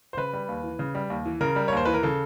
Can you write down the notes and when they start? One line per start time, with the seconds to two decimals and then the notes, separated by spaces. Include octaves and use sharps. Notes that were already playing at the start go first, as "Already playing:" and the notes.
0.13 C5
0.17 C#3 B4
0.33 G3
0.48 D#2
0.64 E3
0.79 C#3
0.95 G3
1.10 D#2
1.25 E3
1.41 C#3 A#4
1.56 G3
1.68 C#5
1.72 D#2 C5
1.85 E3 B4
1.94 A#4
2.03 C#3 A4